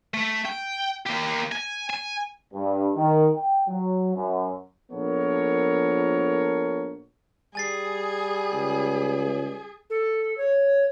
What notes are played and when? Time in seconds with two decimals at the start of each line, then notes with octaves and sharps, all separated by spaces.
0.14 A3
0.45 G5
1.06 A#3 G4
1.52 G#5
1.90 G#5
2.54 G2
2.96 D#3
3.36 G5
3.68 F#3
4.16 F#2
4.92 A#1 F3 B3 A4 A#4 C#5
7.55 G3 G#4 G#5 A6 C7
8.52 C#2
9.90 A4
10.38 C#5